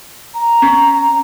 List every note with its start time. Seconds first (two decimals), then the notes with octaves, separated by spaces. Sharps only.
0.34 A#5
0.62 C#4